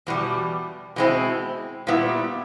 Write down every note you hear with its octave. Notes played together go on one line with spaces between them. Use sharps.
E2 B2 G3
B2 G#3 C4 E4
A#2 G3 B3 E4